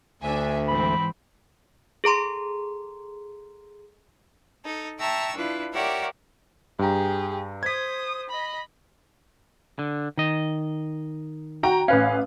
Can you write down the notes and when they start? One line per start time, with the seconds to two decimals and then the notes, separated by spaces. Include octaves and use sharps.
0.22 D2 D4 E5 G#5
0.68 G#2 E3 C4 B5
2.04 G#4 A4 A#5 C6
4.64 D#4 A4
4.99 E5 G5 A5 A#5 C#6 E6
5.35 D4 E4 F4 B4
5.73 G4 A#4 C#5 D5 E5 F#5
6.79 G2 G4 G#4 A#5
7.63 C5 D#6 G#6 B6
8.29 D#5 B5
9.79 D3
10.18 D#3 D#5
11.63 F#4 G5 A#5
11.88 A1 C#4 B4 F5